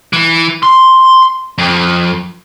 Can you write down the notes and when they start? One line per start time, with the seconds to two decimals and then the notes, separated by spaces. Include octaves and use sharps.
0.13 E3
0.63 C6
1.58 F2